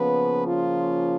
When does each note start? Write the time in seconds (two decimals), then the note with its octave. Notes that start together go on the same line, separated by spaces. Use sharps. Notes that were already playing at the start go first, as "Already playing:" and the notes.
Already playing: C#3 F3 A#3 B3 C#4 B4
0.47 F4